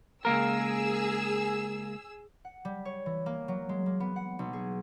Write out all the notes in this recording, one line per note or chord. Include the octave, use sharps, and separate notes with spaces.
C#2 A#3 G#4 A#4 E6
F#5
G3
C#5
E3
A#3
F#3
G#3
A#3
B3
F#5
B1
G#4